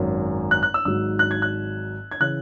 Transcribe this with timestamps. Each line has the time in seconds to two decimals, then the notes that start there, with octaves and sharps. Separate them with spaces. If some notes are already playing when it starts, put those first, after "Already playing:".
Already playing: G#1 F#2 F#3
0.51 F#6
0.63 F#6
0.74 E6
0.85 G#1 G#2 F#3 E6
1.19 F#6
1.31 G#6
1.42 F#6
2.11 G#6
2.20 C#3 E3 F#6